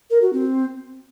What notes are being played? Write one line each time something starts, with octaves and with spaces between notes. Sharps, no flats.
A#4
F#4
C4